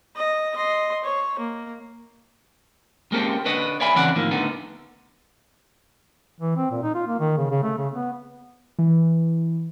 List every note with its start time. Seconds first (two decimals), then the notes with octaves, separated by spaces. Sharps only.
0.16 D#5
0.56 D#5 C6
1.04 C#5
1.39 A#3
3.12 G#3 A#3 C4 C#4 G4 A4
3.45 D3 B4 C#5 D#5
3.80 C#5 D5 E5 G#5 B5
3.95 C#3 E3 C4 C#5 D5 F#5
4.16 A2 D#3 F3 A#3
4.31 D3 A3 B3 D#4
6.40 E3
6.57 C4
6.71 A#2
6.83 D#4
6.95 F4
7.08 A#3
7.19 D#3
7.38 C#3
7.51 C#3
7.63 A3
7.78 C#3
7.93 B3
8.79 E3